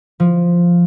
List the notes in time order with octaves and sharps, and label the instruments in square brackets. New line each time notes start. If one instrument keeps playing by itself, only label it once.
[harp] F3